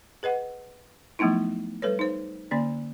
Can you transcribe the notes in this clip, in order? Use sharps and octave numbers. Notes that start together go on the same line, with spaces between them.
G#4 B4 D#5 F#5
F3 F#3 A3 B3 D#4 E4
G3 A4 B4 C#5
D#4 C5
D3 A#3 C#4 D5